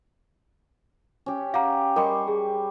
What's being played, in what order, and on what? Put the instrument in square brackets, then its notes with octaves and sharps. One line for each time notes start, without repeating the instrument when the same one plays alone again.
[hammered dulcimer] C#4 G4
[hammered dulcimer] G4 [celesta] F5 F#5 A#5
[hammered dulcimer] G3 C6 C#6 [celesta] A#4 D#5
[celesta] G#4